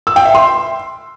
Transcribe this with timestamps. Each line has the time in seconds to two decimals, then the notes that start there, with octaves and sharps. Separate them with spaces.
0.07 E6
0.16 G5
0.25 E5
0.35 C6